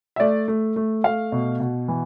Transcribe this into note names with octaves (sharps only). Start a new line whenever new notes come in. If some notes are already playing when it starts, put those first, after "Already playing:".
E5
A3 D5
A3
A3
A3 F5
B2
B2
E3